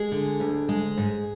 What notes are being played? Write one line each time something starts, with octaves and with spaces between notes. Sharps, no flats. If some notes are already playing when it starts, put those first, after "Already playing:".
Already playing: G#3 G#4
D3
D2
G#3 G#4
G#2